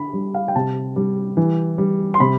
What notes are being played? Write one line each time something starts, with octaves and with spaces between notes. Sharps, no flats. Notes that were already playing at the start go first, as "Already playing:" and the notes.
Already playing: D3 B5
G3
F5
G5
C3 A5
G3
E3
G3
C6
C3 B5